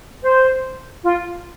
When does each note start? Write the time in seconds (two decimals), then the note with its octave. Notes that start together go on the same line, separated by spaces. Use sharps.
0.21 C5
1.03 F4